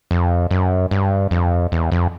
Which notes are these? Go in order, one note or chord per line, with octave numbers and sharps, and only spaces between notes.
F2
F#2
G2
F2
E2
F2